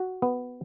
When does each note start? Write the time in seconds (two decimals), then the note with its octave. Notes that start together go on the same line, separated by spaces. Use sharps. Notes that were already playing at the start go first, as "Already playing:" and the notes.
Already playing: F#4
0.22 B3